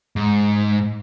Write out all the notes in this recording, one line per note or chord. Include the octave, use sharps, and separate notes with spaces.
G#2